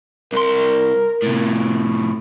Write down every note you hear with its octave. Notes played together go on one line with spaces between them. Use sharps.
C2 A#4 C6
A2 C3